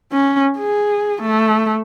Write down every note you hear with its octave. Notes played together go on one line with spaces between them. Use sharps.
C#4
G#4
A3